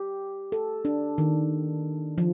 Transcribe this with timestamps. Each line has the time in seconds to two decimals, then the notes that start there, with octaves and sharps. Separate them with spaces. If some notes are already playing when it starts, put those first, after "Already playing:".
Already playing: G4
0.52 A4
0.85 D4
1.18 D#3
2.18 F3